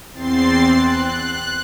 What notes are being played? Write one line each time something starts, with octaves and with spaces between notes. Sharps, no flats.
E2 C4 C6 A6 C7
F#6